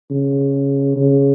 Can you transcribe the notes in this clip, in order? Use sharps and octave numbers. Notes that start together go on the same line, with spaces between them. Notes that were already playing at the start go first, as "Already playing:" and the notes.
C#3
C#3